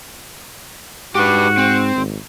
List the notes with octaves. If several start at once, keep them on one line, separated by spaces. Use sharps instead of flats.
G#2 F#4 G4 B4
C4
G#1